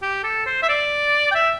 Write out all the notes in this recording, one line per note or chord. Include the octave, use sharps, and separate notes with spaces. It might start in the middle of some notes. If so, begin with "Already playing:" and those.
G4
A4
C5
E5
D5
G5
E5